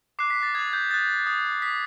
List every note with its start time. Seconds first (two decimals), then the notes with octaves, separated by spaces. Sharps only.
0.19 D6 F#6 C7
0.30 B6
0.43 A6
0.55 D#6 F#6 G#6
0.73 G6
0.91 D#6 F#6 A6
1.26 D#6 F#6
1.62 D#6 F#6 B6